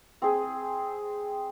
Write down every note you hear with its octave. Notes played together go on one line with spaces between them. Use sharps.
C4 G#4